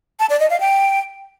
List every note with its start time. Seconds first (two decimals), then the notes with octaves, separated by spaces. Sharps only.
0.19 A5
0.30 D5
0.40 D#5
0.50 F5
0.60 G5